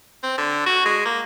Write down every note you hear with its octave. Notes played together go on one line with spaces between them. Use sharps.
C4
D3
F#4
G#3
A#3